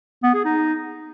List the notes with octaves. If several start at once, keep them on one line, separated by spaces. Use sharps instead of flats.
B3
G#4
D#4